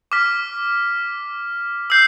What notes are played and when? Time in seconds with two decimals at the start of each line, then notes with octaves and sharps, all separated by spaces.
0.12 D6 F6 B6
1.90 E6 G6 C7